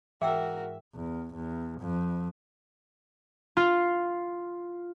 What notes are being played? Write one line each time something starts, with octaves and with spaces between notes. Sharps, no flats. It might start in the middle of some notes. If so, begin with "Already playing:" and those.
G#2 E3 F#4 G#4 A#4 E5 G5 E6
E2
E2
F2
F4